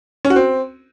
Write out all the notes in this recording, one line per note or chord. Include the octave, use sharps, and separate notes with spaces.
C#4
F#4
C4